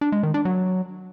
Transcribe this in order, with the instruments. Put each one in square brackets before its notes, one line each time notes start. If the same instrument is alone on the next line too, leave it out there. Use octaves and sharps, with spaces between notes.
[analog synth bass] D4
G#3
D#3
D4
F#3